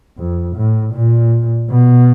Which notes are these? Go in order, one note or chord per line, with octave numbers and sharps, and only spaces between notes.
F2
A2
A#2
B2